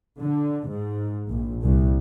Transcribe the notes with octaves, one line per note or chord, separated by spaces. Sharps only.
D3
G#2
A#1
C2